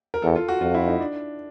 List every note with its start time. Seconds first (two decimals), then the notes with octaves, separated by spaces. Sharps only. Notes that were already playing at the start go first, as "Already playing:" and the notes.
0.14 A#4
0.22 E2 A4
0.36 F4
0.49 F#4
0.61 F2 F4
0.74 E4
0.87 D#4
1.00 D4